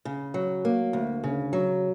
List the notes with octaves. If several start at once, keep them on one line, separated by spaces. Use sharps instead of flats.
C#3
F#3
A#3
D2
C#3
F#3